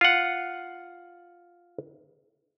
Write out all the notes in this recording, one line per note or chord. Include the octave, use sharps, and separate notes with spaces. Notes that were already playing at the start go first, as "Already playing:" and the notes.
F4 F#5